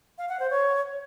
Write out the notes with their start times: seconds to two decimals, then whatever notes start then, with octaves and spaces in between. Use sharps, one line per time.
0.18 F5
0.29 F#5
0.39 C5
0.50 C#5